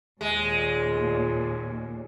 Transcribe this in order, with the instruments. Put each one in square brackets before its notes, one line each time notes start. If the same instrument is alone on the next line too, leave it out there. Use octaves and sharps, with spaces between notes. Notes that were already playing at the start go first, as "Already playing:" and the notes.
[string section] D#2 A#2 [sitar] G#3